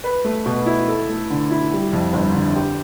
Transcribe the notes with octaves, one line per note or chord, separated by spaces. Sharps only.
B4
A3
B2
E4
A4
A3
D3
E4
G3
F2
G1
D3
G4